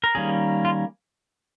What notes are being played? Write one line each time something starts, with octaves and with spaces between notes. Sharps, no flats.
A#4
D#3 G3 A#3 C#4 G#4
F4